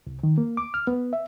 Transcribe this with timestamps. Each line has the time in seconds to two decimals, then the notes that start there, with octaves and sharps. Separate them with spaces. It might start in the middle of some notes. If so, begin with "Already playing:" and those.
0.07 C2
0.23 D#3
0.38 A#3
0.57 D6
0.74 F6
0.87 B3
1.13 E5